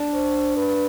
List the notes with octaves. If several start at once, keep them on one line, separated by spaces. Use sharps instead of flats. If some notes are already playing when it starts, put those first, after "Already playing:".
Already playing: D4
C5
B4